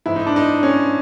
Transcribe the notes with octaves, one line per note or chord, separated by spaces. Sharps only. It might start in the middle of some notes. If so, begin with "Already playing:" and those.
G#2 E3 E4
D#4
D4
D#4
C#4